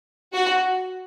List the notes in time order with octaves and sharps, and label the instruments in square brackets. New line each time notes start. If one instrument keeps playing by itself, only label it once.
[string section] F#4